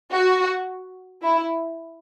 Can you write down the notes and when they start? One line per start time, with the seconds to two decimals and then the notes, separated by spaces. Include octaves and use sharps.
0.12 F#4
1.22 E4